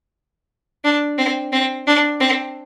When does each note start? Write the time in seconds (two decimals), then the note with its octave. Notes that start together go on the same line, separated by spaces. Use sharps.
0.84 D4
1.18 C4
1.52 C4
1.87 D4
2.20 C4